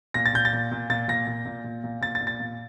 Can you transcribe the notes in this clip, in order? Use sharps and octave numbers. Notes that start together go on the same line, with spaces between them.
A#2 A#6
A6
A#2 G6
A6
A#2
A#2
A#2 A6
A#2 A#6
A#2
A#2
A#2
A#2
A#2 A6
A6
A#2
A6
A#2